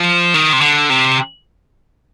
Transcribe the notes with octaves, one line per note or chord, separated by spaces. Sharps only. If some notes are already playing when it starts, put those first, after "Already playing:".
Already playing: F3
D#3
C3
D3
C3